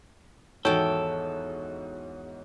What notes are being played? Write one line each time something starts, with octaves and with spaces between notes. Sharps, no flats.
E2 G#2 D#3 F#4 A4 C#5 G5